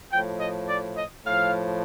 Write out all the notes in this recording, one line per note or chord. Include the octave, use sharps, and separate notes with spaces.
A2 F3 G5
D#5
D5
D#5
A2 F3 F5